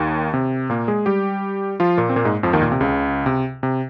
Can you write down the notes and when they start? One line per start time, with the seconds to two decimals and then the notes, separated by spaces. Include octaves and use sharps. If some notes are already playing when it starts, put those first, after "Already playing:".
Already playing: D#2 D#3
0.34 C3
0.70 A#2 A#3
0.88 G#3 G#4
1.06 G3 G4
1.80 F3 F4
1.97 A#2 A#3
2.09 C4
2.16 A#2 A#3
2.25 G#2 G#3
2.43 F2 F3
2.53 D#2 D#3
2.62 A#2
2.72 C3
2.81 C#2 C#3
3.26 C3
3.63 C3